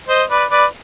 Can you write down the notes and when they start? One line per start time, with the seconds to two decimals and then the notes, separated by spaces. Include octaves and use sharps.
0.09 C5 D#5
0.30 B4 D5
0.51 B4 D5